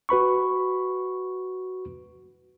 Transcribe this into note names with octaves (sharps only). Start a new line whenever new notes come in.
F#4 B4 B5 C#6